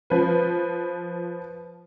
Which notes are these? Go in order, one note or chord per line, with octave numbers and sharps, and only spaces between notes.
F3 B4